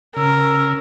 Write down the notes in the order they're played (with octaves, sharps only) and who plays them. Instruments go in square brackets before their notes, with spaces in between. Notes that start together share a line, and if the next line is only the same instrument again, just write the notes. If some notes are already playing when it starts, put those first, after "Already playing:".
[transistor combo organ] C#3 [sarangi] A#4 [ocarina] E6